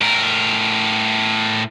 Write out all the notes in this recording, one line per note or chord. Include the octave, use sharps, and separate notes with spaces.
A2 A#4